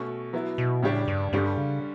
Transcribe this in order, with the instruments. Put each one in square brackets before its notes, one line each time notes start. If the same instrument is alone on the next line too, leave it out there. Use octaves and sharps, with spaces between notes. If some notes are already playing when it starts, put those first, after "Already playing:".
Already playing: [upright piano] B2 A3 C#4
F#3 B3 E4
[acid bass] B2
[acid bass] A2 [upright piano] C#3 G3 D4 G4 C#5
[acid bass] G2
[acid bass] G2 [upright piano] D3 G3 C#4
[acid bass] C#3